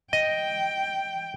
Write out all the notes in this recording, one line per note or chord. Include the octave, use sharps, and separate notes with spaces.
D#5 G5